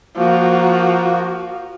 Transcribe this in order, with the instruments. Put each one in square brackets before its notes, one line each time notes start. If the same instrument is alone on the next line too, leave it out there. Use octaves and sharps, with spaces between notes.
[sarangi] F3 [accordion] A#3 F#4